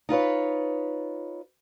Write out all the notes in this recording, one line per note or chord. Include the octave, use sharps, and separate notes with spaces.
D#4 F4 B4 C#5